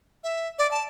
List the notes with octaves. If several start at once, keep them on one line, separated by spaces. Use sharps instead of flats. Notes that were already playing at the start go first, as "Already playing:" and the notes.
E5
D5
A5